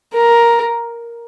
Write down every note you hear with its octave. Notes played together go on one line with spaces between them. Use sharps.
A#4